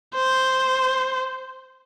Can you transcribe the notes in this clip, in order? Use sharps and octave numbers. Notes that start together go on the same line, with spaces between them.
C5